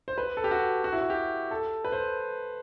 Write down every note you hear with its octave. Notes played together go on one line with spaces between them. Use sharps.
C5
B4
A4
G4
F#4
F#4
E4
F#4
G4
A4
B4
C5